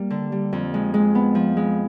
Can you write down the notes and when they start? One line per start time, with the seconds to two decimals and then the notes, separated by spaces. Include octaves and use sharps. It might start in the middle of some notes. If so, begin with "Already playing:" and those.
Already playing: G3 A#3
0.10 D3
0.32 G3
0.53 F2
0.74 G#3
0.94 G#3
1.15 B3
1.35 F3
1.57 G#3